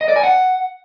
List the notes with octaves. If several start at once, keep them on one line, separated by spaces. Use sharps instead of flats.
D#5
D5
G#5
F#5